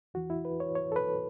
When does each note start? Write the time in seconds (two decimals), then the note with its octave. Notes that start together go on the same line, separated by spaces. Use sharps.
0.14 E2 E3 F#4
0.30 E4
0.45 B4
0.60 C#5
0.75 C#5
0.92 A4
0.96 B4